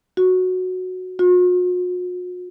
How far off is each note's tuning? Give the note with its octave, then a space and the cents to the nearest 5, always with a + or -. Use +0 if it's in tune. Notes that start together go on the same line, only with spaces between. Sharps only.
F#4 -5
F#4 -45